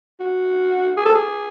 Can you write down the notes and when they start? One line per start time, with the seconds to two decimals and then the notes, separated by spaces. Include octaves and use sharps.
0.20 F#4
0.97 G#4
1.06 A4
1.15 G#4